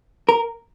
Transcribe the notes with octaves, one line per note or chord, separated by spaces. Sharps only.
A#4